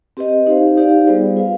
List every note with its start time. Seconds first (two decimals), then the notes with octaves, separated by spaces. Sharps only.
0.17 C4 G4 B4 D#5
0.46 D#4 G4 C5 F5
0.77 D#4 G4 D5 F5
1.07 G3 B3 F4 G#4 C5
1.37 F4 B4 F5